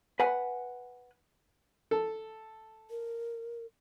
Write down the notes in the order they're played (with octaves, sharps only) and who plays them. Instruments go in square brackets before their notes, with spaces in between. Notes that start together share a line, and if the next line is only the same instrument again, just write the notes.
[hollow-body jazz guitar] B4 F#5 G#5
[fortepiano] A4
[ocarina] A#4